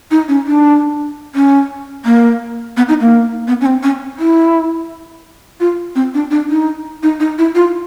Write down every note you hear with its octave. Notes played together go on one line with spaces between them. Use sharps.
D#4
C#4
D4
C#4
A#3
B3
D#4
A#3
B3
C#4
C4
C#4
E4
F4
C4
D4
D4
D#4
D#4
D#4
E4
F4